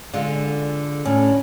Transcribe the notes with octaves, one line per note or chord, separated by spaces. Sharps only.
D3 G#3 F4
A2 C#4